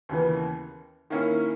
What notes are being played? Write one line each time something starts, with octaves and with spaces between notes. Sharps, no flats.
D#2 C#3 E3 B3
D#3 A#3 C#4 E4